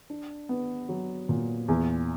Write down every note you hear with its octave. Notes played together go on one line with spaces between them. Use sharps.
D4
B3
F#3
A#2
E2